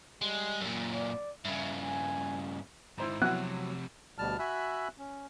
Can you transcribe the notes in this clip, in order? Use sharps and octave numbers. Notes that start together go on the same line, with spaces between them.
G3 G#3
F#2 A#2
D5
G2 C#3 E5
G#5
G#2 D#3 E4 C5 A#5
F2 C3 F#3 B3 E4 F#4 F#5 F#6
D2 B2 G3 A5 F6
F#4 E5 G#5 B5 E6 F#6
C#4